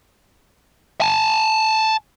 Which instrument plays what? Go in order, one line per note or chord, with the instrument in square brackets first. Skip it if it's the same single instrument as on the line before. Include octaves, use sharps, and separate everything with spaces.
[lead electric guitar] G#5 A5